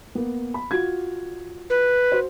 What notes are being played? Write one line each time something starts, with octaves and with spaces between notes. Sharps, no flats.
A#3 B3
B5
F4 F#4 G#6
B4
F#4 C5